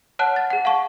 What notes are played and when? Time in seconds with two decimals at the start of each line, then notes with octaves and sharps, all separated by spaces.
0.19 C#5 F#5 A5 F6 F#6
0.36 A6
0.50 G#4 F#5
0.65 F5 A5 C#6